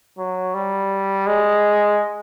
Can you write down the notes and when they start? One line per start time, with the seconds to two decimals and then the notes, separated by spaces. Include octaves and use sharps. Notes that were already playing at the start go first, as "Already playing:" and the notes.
0.18 F#3
0.54 G3
1.27 G#3